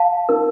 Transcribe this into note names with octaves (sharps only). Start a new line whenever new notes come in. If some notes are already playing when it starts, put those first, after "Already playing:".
Already playing: F5 A5
D#4 A#4